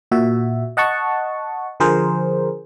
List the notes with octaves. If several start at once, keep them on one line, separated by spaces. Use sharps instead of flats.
A#2 F#4 E5
D#5 F#5 A5 C#6
D3 F3 G#4 A#4 C5